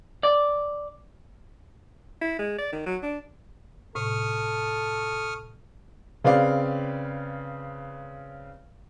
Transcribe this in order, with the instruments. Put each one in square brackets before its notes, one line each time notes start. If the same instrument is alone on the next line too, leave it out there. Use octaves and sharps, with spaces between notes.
[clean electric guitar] D5
[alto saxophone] E4
G#3
D5
D#3
F#3
D4
[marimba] A2 C3 [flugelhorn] A4 [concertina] C#6 D#6 F6
[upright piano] C#3 C4 B4 D5 F5